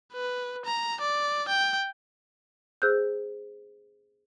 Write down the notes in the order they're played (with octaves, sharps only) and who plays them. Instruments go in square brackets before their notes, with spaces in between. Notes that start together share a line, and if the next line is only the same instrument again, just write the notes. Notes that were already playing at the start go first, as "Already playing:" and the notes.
[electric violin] B4
A#5
D5
G5
[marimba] G#4 C5 E6 F#6 G6